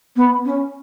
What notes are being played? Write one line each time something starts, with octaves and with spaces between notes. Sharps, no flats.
B3
C#4